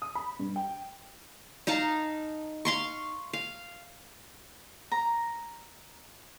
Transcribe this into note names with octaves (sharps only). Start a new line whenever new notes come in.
D#6
B5
G2
G5
D#4 F5 A5 A#5
F5 C6 C#6
F5
A#5